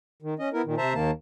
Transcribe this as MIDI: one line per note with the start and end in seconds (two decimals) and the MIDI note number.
0.22 0.34 51
0.39 0.49 61
0.39 0.49 75
0.53 0.62 59
0.53 0.62 64
0.53 0.62 70
0.65 0.75 46
0.65 0.75 51
0.77 0.94 48
0.77 0.94 72
0.77 0.94 76
0.77 0.94 81
0.77 0.94 82
0.94 1.11 39
0.94 1.11 51
0.94 1.11 58
0.94 1.11 81